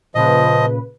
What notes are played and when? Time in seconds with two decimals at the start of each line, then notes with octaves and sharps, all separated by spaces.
0.15 A#2 C#3 F3 B4 D#5